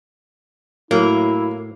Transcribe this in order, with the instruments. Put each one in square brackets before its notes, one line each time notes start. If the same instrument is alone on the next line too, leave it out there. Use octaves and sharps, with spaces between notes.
[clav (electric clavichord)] A2 [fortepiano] F#3 [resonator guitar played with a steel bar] A#3 [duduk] E4